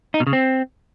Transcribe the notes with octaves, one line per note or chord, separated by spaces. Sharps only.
D#4
B2
C#3
C4